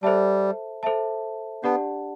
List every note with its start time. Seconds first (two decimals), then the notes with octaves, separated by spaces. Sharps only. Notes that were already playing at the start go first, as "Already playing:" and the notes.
0.03 G3 A4 C5 E5 A5
0.83 A4 C5 E5 A5
1.63 B3 D4 G4 D5 F#5 A5